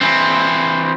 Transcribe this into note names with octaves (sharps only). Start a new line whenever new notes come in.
E3 C4